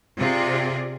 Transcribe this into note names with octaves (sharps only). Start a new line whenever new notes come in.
C3 F4 G#4 D5